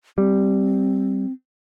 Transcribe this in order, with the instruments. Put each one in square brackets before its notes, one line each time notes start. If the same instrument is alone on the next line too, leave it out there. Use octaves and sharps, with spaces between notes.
[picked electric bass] G3 [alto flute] C4